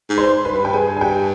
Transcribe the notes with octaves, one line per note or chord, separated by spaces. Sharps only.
G#2
C5 C6
B4 B5
G2
G5
G#4 G#5
G#5
G4 G5